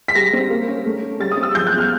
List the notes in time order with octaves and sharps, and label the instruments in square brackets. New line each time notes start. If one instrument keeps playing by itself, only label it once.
[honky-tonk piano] B6
G3 A#6
C4
A#3
C#4
A3
C#4
G3 A6
D#6
C4
E6
F3 G6
F#6
E2
F6